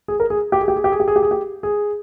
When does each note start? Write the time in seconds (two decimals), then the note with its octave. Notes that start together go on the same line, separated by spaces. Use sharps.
0.08 G#4
0.20 A#4
0.30 G#4
0.52 G4
0.61 G#4
0.68 G4
0.76 G#4
0.84 G4
0.92 G#4
1.00 G4
1.08 G#4
1.16 G4
1.23 G#4
1.31 G4
1.63 G#4